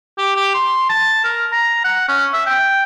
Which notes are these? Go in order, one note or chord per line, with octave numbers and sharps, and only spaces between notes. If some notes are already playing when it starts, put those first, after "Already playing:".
G4
G4
C6
A5
A#4
A#5
F#5
C#4
E5
G5